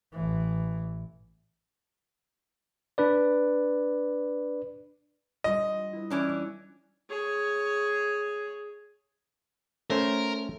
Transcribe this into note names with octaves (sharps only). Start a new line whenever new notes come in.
A1 E3
D4 B4 D5
G3 D4 F4 D#5
E4 B4
E3 C#4 D4
G#4 C#5
A3 C#4 A#4 C5